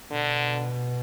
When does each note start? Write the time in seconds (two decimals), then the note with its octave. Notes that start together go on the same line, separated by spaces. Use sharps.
0.11 B2 D3